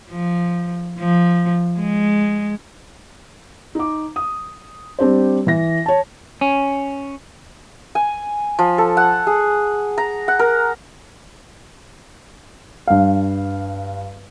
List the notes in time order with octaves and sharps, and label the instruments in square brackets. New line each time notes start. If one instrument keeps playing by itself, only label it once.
[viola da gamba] F3
F3
G#3
[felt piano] D#4 D6
D#6
G3 C4 D4 G4 C5
E3 A#6
C#5 A5
[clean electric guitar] C#4
[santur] G#5
F3
A4
F#5
G#4
A#5
F#5
A#4
[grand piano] G2 F5